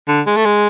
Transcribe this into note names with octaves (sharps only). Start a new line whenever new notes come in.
D3
G#3
A3
G#3